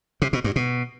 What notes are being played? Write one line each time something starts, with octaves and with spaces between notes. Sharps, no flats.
C3
B2
G2
B2